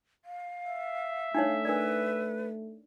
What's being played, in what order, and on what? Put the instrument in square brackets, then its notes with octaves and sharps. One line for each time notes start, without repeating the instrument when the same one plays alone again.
[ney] F5
[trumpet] E5
[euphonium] A3 [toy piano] D4 D#4 C#5 [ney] F5
[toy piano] D4 A#4 D5 [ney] B4